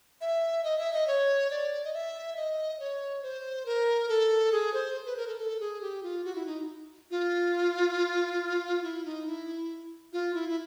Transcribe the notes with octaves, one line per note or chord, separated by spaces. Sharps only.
E5
D#5
E5
D#5
C#5
D5
D#5
E5
D#5
C#5
C5
A#4
A4
G#4
C5
B4
A#4
A4
A4
G#4
G4
F4
F#4
E4
D#4
F4
E4
D#4
E4
F4
E4
E4